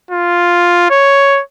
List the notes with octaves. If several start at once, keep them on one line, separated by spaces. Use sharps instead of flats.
F4
C#5